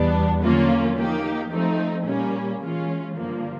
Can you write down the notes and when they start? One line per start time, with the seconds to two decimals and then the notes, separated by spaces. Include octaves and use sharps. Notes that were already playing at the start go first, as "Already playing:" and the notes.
Already playing: E2 B2 G3 B3 D4
0.42 D3 F#3 A#3 C#4 F4
0.97 F3 A#3 D#4 G4
1.51 F3 A3 C4 D#4
2.06 A#2 G3 A#3 C#4
2.61 E3 G#3 C#4 F4
3.15 G2 D3 F3 A#3